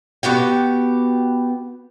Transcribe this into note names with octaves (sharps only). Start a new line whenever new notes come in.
B3 F#4 G4 G5